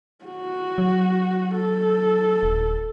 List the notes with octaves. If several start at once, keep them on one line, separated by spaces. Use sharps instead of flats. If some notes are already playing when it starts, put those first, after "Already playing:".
F#4
F#3
A4
D#1